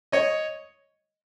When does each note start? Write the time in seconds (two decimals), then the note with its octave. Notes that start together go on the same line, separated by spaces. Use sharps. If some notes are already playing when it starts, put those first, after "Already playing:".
0.12 C#5 D#5